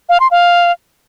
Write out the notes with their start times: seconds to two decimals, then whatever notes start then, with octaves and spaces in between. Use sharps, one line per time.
0.09 F5
0.20 C6
0.31 F5